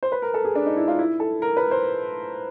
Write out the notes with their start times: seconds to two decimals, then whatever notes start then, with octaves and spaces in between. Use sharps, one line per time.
0.03 C5
0.12 B4
0.22 A#4
0.34 A4
0.45 G#4
0.55 D4
0.66 D#4
0.77 E4
0.88 F4
0.99 E4
1.20 A4
1.42 A#4
1.57 B4
1.71 C5